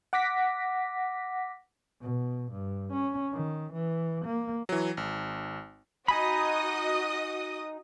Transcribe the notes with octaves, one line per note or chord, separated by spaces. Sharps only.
F#5 D6 A#6 B6
B2
G2
C#4
D#3
E3
A#3
E3 F#3
G#1
D#4 F#4 D#5 G#5 B5 D#6